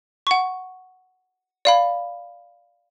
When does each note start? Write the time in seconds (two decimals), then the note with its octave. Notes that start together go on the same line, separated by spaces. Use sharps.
0.27 F#5 C#6
1.65 D5 F5 B5